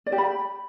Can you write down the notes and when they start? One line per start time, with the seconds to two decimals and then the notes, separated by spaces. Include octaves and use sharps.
0.06 D5
0.12 G4
0.18 B5